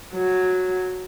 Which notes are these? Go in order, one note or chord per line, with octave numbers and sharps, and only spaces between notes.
F#3